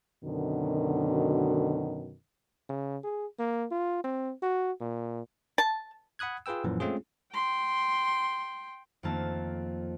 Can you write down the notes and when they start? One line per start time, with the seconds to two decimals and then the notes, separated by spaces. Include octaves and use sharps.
0.23 F#2 B2 D3 D#3
2.69 C#3
3.03 G#4
3.39 A#3
3.71 F4
4.04 C4
4.42 F#4
4.81 A#2
5.58 A5
6.19 F#5 B5 D#6 F#6 G#6
6.46 F4 G#4 B4 G5 E6
6.64 F#2 A#2 E3 F3
6.80 G#3 A3 C4 C#4 F4 G#4
7.33 G5 C6
9.03 F2 D#3 A3 A#3 A5